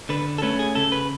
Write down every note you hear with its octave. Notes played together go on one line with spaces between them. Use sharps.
D3 B4
A4
A3 C#4 B4
G#4
C#3 A4
B4